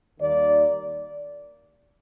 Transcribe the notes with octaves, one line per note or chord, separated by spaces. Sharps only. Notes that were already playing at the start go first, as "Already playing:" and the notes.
D#2 D#3 G3 A#3 D5